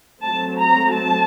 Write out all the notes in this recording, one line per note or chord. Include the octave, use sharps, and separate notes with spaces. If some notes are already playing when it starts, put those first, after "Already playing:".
F#3 A3 C4 A5
A#5
A5